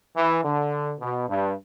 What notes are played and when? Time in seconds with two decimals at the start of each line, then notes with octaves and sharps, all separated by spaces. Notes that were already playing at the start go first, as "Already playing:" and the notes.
0.16 E3
0.43 D3
1.00 B2
1.27 G2